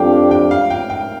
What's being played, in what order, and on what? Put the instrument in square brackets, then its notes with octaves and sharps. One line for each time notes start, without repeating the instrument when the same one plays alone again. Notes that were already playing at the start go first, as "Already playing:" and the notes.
Already playing: [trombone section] F2 F3 D4 G4 [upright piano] F5 G5
[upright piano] G5
F5
G5
G5